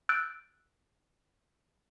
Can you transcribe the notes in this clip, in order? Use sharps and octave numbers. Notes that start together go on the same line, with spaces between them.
E6 F#6 G6 A6 D7